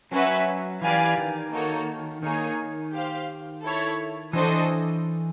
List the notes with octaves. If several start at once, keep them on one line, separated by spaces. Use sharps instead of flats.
F#3 C#4 F#4 B4 E5
E3 G4 B4 D5 F5 G#5
D#3
A#3 D#4 F#4 A4 C#5
D#3 A#3 D#4 G#4 C#5
G4 C5 F5
E4 A4 C#5
E3 D4 F#4 A4 C5 D#5